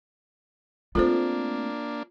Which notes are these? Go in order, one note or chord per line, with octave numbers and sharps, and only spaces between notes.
A3 A#3 C4 D4 F4 A4 C5